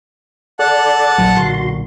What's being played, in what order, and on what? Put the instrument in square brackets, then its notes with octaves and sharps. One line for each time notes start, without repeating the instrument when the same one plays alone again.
[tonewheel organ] A4 D5 [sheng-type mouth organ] F#5 A5 F#6
[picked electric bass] A#1 A#2 F#3
[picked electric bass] B1 A#2 D3 [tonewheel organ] F#4 C6